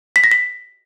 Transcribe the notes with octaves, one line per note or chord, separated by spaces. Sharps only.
B6
A#6
B6